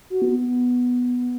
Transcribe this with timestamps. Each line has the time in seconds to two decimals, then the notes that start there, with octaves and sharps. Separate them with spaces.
0.10 F#4
0.22 B3
0.35 B3